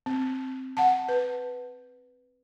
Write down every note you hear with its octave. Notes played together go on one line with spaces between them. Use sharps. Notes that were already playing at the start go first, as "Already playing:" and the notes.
C4
F#5 A5
B4